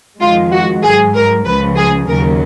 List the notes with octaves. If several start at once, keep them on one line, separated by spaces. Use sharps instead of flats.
F2 D#3 G#3 F4
F#4
G#2 F#3 G#4
A#4
C#2 C#3 F3 B4
G#4
D#2 C#3 F#3 A#4